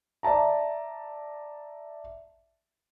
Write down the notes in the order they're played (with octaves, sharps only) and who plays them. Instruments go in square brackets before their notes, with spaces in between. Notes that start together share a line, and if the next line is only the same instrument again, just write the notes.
[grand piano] D5 E5 A5 A#5